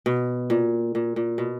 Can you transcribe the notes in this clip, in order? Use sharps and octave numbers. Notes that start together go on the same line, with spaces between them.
B2
A#2
A#2
A#2
B2